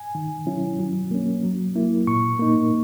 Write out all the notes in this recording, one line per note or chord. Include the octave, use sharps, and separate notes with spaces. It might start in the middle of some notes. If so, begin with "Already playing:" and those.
Already playing: G#5
D#3
F#3 C#4 E4
F#3
A#3 C#4
F#3
A#3 E4
A#2 C#6
A#3 D#4